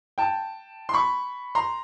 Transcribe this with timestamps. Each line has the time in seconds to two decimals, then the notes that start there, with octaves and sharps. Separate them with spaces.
0.18 G5 A5
0.89 C6
0.94 B5 C#6
1.55 A#5 C6